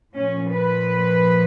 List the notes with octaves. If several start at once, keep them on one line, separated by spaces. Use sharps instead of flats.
A#2 F3 C#4
B4